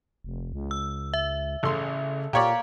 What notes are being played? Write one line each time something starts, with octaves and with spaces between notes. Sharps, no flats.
F1
C#2
E6
E5
A1 C#3 A4 C6
A#2 A#3 G4 C#5 D5